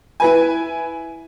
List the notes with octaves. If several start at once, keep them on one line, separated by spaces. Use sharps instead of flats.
E4 B4 G#5